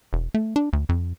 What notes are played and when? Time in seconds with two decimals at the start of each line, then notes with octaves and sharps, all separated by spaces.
0.13 E1
0.34 A3
0.56 D4
0.73 D2
0.89 F2